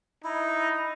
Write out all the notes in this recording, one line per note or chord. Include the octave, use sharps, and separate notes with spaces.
D#4 E4